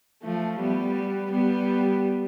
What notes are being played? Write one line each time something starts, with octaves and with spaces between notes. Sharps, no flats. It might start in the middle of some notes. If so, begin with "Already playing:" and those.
F3 A3
G3 B3
G3 B3